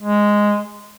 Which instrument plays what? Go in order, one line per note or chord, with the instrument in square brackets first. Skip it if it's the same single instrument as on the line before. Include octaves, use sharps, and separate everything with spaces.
[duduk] G#3